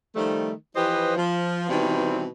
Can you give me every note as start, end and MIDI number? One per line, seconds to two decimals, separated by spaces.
0.15 0.53 51
0.15 0.53 53
0.15 0.53 55
0.15 0.53 57
0.76 1.16 52
0.76 1.16 53
0.76 1.16 67
0.76 1.16 71
0.76 1.16 72
0.76 1.16 75
1.17 1.69 53
1.69 2.26 47
1.69 2.26 51
1.69 2.26 52
1.69 2.26 55
1.69 2.26 60